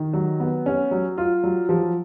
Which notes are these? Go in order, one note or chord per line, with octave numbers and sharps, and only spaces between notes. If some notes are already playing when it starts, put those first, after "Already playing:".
Already playing: D#3
F#3
B3
C#4
F#3
F4
F#3
F3